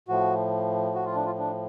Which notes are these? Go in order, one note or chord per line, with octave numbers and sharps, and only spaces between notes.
A2 F3 F#4
F#4
F4
D4
F4
D4